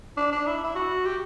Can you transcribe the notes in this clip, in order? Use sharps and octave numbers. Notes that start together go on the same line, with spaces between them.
D4
D4
E4
E4
F#4
G4